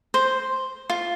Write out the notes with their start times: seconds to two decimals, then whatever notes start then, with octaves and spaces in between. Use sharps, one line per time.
0.14 C5
0.90 F4